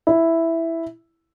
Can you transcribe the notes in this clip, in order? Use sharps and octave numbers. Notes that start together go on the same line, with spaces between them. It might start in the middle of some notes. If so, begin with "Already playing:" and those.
E4